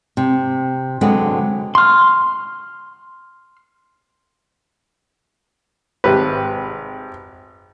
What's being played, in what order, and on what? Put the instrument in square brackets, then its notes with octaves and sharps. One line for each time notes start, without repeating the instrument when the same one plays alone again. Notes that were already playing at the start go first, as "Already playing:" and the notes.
[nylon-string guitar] C3
D3 F#3 G#3 B3 C4
[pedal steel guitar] C6 F6
[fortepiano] G#1 C3 B4